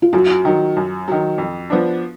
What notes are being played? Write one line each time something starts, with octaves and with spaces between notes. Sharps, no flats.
F4
F#2 F#4
D#3 F#3
F#2
D#3 F#3
F2
F3 B3 D4